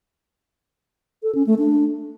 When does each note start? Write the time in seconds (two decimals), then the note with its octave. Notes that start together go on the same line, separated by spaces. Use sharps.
1.23 A4
1.35 C#4
1.47 A3
1.59 D4